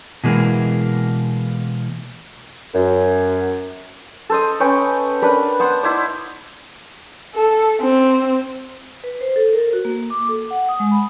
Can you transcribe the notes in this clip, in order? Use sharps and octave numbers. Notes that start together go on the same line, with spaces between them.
B2 E3 G#3 A#3
F#2
A4 C5 D#5
C#4 B4 G5 C#6
D4 A#4 B4 B5
B3 C5 F#5
D#4 E4 C5 D5
A4
C4
B4
C5
A4
A#4
F#4
A#3
D6
A4
F#5
D#6
G#3
B5